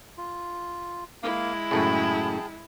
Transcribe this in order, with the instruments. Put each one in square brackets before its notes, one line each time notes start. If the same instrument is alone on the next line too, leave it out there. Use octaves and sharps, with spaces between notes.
[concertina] F4
[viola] G#3 E4 [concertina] A#3 F5
[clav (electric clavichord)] F#2 A2 C#3 [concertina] G#4 G5 A5